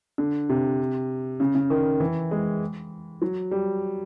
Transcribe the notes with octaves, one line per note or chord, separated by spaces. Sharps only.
D3
C3
C#3
C#3
D#3
E3
G#3
F#3
G3